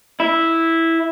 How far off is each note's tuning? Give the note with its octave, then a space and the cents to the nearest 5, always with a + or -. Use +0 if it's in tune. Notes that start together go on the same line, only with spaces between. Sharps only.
E4 -5